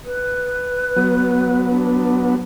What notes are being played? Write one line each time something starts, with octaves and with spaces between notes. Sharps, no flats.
B4
F#3 B3
D4